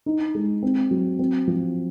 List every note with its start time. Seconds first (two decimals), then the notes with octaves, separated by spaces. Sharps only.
0.06 D#4
0.35 G#3
0.63 C4
0.91 F#3
1.19 C4
1.47 F3